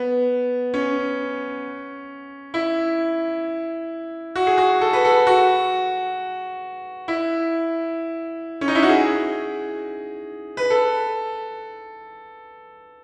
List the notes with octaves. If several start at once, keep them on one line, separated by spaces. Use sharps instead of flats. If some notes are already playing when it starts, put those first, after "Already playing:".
Already playing: B3
C#4
E4
F#4
G#4
F#4
A4
B4
A4
F#4
E4
C#4
D#4
E4
F#4
G#4
B4
A4